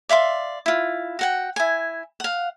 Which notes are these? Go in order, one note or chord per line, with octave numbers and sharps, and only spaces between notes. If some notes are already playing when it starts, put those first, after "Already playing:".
D5 E5 F5 C6
E4 F4
F#4 F#5 G5
E4 G#5
F5 F#5